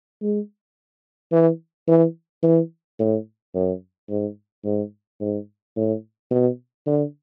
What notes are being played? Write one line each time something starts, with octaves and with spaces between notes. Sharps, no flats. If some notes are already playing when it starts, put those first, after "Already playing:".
G#3
E3
E3
E3
A2
F#2
G#2
G#2
G#2
A2
B2
D3